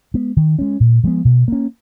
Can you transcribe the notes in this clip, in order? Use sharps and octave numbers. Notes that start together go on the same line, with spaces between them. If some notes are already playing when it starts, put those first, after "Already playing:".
G#3 B3
D#3
G#3 C#4
A#2
F3 G#3 B3
B2
A#3 C#4